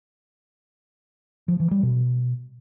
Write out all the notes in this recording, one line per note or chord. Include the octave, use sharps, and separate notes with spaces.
F3
E3
G3
B2